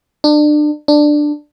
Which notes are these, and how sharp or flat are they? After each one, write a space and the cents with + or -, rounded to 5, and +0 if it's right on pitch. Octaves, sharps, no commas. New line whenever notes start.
D4 +30
D4 +10